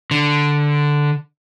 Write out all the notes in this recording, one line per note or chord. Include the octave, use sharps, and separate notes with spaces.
D3